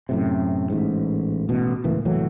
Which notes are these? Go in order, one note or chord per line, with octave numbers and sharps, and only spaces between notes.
F#2 A2 C3
A1 G#2
A1 B2
C#2 A2 E3 A#3
C2 A2 E3 F#3